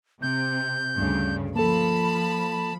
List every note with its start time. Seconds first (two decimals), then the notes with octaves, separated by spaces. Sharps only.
0.22 C3 G6
0.97 D2 G2 C#3
1.55 F3 A#3 A4 A5 B5